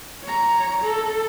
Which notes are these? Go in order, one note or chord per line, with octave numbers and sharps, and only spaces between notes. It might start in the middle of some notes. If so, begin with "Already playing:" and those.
C#5 A#5
A4